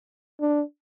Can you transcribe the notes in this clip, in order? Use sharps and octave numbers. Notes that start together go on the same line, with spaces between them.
D4